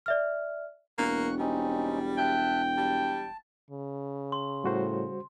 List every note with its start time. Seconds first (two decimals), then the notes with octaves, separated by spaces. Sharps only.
0.06 D5 E5 F6
0.98 E1 A#3 C#6 F#6
1.39 G3 C4 C#4 D#4
2.18 E5 G5 A5 F#6
2.77 G3 A5
3.70 C#3
4.32 C6
4.64 A2 G3 F#4 C5